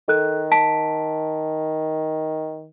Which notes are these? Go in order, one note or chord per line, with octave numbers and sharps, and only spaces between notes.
D#3 A4 F#6
A5 B6 D7